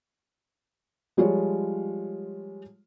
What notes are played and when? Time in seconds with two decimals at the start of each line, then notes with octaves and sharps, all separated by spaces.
1.17 F3 G3 G#3 F4 C#5